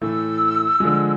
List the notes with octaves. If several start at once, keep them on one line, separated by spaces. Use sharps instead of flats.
A2 E3 A3 E6
D3 F3 G#3